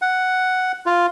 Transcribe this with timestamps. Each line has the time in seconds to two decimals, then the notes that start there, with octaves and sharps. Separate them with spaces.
0.02 F#5
0.86 F4